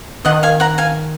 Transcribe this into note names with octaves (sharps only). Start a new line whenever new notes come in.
D#3 D#5 F#5
F5 G#5
F#5 A#5
F5 G#5